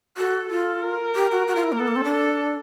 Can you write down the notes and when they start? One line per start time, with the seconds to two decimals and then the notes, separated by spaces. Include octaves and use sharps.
0.17 F#4 A4
0.49 F4 A4
0.82 A#4
1.15 G4
1.31 F#4
1.47 F#4
1.55 F4
1.64 E4
1.72 A#3
1.79 B3 A4
1.87 A#3
1.96 C4
2.04 D4
2.12 A4